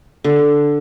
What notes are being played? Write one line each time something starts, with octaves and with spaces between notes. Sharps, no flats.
D3